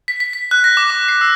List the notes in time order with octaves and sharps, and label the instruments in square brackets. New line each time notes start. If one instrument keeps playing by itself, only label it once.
[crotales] B6
B6
B6
F#6
A#6
D6
D6
C7
E6